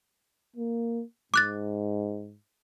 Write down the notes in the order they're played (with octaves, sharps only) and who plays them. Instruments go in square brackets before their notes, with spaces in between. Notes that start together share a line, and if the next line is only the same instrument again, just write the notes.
[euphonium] A#3
[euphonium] G#2 [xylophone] D6 F#6 A6